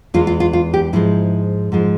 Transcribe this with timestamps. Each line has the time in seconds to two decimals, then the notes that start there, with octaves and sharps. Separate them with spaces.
0.14 E2 E3 G#3 F4
0.27 F4
0.40 F4
0.53 F4
0.74 G4
0.93 G#2 F3 G#3 E4
1.72 G#2 F3 G#3